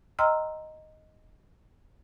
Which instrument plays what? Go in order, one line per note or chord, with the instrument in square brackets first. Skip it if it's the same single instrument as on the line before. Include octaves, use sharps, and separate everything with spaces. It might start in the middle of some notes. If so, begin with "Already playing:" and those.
[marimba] D#5 G5 A#5 C6 E6 F6